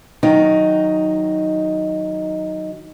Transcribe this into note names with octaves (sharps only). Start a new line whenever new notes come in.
D#3 F#3 D#4